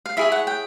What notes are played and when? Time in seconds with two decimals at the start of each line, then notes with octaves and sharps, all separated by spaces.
0.06 F5
0.17 E4 G#4 C#5 E5
0.32 F#5
0.47 G5